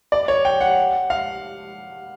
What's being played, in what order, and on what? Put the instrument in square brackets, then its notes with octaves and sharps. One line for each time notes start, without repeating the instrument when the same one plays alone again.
[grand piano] D5
C#5
G5
F#5
F5